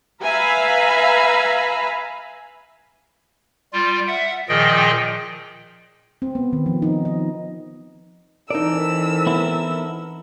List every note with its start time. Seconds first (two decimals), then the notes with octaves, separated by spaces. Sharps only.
0.22 B4 E5 F5 G#5 A#5 B5
3.73 G3 F4
4.08 E5 F#5
4.49 A#2 D#3 F3 G#4 D#5 G5
6.22 C4
6.35 B3
6.53 D#3
6.66 F3
6.82 D#4
7.05 D#5
8.51 E3 C4 D#4 A4 A#4 D5 E6
9.26 B3 E4